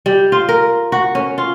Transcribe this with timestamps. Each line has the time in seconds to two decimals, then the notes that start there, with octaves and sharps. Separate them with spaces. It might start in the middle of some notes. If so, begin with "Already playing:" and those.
0.06 G3
0.32 F4
0.49 A#4
0.92 F#4
1.15 C#4
1.38 F4